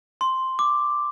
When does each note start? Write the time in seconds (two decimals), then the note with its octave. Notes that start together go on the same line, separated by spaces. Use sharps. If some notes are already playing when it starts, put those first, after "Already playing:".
0.21 C6
0.59 D6